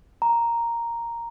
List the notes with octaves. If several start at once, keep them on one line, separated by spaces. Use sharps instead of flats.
A#5